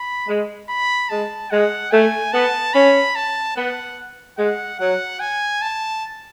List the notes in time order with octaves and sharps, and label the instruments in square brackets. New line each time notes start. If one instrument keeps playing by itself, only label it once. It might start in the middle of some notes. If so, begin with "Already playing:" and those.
Already playing: [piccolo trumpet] B5
[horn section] G#3
[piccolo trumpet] B5
[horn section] G#3 [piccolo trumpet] A5
[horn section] G#3 [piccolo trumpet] F#5
[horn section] A3 [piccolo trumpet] G#5
[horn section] B3 [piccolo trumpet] A5
[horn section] C#4 [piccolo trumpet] B5
[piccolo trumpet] A5
[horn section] B3 [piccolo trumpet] F#5
[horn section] G#3 [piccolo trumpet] F#5
[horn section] F#3 [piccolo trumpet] F#5
[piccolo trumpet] G#5
A5